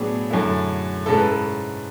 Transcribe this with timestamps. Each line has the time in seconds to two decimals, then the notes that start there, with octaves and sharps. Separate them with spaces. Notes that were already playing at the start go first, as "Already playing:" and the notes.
Already playing: A2 F#3 B3 D4 G#4
0.30 F#2 D3 A3 E4
1.06 G#2 G#3 C#4 E4 A4
1.17 B4
1.27 A4